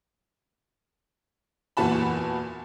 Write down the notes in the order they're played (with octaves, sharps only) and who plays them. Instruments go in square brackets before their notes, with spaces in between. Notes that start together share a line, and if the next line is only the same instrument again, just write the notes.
[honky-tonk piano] E2 A#2 E3 F#4 A5 B5